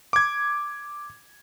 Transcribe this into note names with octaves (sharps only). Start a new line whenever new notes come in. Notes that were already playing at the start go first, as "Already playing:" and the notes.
D6 G#6